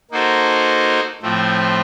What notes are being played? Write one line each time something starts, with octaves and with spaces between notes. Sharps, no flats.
A#3 D#4 F#4 A4 C5
A2 F3 A3 C4